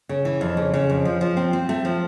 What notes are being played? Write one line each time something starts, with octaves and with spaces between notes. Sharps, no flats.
C#3
E3
F2
C#3
C#3
F2
F3
F3
C4
C4
A3
F3